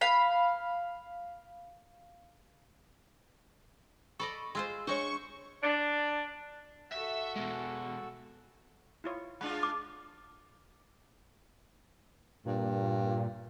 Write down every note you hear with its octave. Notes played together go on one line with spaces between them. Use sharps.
F5 B5
A4 D5 D#5 B5 C#6
G#3 F4 C5 C6 E6
G#3 D4 C5 C#5 C#6
D4
F#4 A4 E5
B2 G#3
E4 F4 C#5
G#3 D4 F4 F#5 B5
D6
G2 A#2